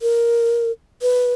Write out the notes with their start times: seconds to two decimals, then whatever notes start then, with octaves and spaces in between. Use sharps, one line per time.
0.02 A#4
1.02 B4